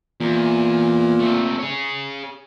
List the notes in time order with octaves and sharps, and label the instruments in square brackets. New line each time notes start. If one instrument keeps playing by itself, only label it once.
[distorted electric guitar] E2 [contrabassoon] A#2
[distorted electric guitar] A3 C4
G#4 C#5